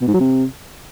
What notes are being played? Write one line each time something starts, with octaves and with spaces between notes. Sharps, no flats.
B2
G#2
F#3
C3